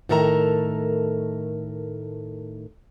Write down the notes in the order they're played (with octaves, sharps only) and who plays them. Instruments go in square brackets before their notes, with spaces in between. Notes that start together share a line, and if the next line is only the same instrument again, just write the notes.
[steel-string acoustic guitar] A2 D#3 A4 A#4 E5 A#5